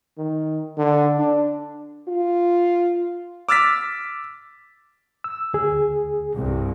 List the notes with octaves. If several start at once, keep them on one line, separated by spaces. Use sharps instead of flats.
D#3
D3
D4
F4
D6 E6 F6 A6 B6
E6
D2 G#4
C2 G2